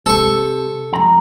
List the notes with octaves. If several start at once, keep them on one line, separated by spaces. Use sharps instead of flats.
C3 A4 C#6
F2 A#5